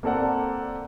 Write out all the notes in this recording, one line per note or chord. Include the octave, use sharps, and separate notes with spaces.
A#3 C4 A4 D5 F#5